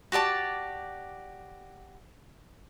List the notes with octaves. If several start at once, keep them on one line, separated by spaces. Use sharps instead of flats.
F#4 G4 D5 A5